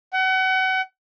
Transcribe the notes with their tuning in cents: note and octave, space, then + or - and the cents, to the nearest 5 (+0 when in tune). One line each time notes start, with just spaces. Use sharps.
F#5 +30